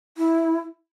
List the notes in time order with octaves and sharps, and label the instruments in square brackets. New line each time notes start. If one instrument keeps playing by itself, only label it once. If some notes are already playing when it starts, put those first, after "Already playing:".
[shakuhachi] E4